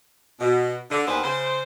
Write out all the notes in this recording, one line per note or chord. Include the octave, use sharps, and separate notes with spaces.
B2
D3
D#2 D#3 B3 G#4 B4 C5
C#3 C5